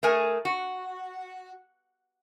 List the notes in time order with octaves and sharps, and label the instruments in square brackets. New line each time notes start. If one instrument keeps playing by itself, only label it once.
[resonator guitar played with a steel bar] A3 G#4 A#4 G#5
F#4